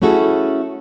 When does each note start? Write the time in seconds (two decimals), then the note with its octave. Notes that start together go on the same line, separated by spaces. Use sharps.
0.02 A3 C#4 E4 F#4 G#4 A4